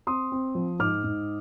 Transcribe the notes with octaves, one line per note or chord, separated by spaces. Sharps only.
C4 C6 D#6
C4
F3
G#2 D6 F6
G#2